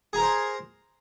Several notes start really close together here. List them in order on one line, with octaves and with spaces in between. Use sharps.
G#4 A#5 A#4 C5 C6